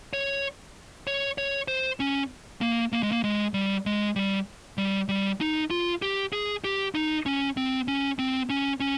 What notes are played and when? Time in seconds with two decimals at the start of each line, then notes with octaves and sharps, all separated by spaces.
0.13 C#5
1.07 C#5
1.38 C#5
1.68 C5
2.00 C#4
2.61 A#3
2.92 A#3
3.03 G#3
3.12 A#3
3.24 G#3
3.54 G3
3.86 G#3
4.16 G3
4.78 G3
5.09 G3
5.40 D#4
5.70 F4
6.02 G4
6.33 G#4
6.64 G4
6.95 D#4
7.26 C#4
7.57 C4
7.88 C#4
8.19 C4
8.50 C#4
8.80 C#4